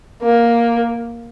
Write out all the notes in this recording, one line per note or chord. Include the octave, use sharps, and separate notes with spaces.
A#3